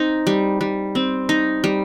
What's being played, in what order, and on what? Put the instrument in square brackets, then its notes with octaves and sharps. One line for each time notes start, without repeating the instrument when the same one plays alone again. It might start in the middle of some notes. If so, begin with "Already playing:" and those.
Already playing: [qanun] C4 D#4
G3
G3
C4
D#4
G3